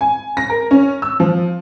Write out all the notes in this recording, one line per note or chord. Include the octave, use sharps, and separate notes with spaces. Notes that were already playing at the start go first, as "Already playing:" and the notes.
G#5
A#6
A#4
C#4
E6
F3